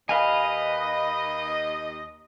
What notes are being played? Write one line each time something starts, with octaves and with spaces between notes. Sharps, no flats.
D#2 B4 D#5 F5 G#5